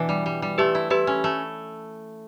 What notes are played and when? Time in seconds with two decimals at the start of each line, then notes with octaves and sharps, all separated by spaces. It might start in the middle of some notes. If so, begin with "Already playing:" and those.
Already playing: B2 E3 D4
0.09 G3
0.26 G3
0.42 G3
0.58 A3 G4 B4
0.75 E4
0.90 E4 G4 B4
1.07 C#4
1.24 A3